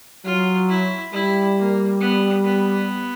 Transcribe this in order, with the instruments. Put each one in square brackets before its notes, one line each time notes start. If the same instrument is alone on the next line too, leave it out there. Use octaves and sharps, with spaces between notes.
[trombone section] F#3 [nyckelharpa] F4
[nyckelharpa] E4
[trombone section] G3 [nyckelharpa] E4
[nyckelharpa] A#3
B3
B3